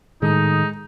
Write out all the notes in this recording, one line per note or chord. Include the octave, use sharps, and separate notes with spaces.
A2 D#3 G#3 D#4 A4 D#6